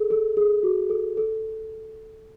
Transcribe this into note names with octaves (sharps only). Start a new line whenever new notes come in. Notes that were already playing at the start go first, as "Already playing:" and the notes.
Already playing: G#4 A4
A4
G#4
F#4
A4
A4